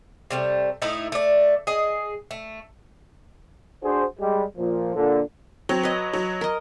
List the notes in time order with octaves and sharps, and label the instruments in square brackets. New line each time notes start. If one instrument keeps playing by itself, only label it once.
[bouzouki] C3 G3 A3
A2 A3 D#4 E4
A3 D5
G#4 D#5
A3
[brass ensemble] D4 F#4 G#4 C5
G3 G#3
A#2 F3
A#2 D3
[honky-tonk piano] F#3 [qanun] C4
[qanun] B4 D#5
[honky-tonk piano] F#3
[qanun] A#4 D#5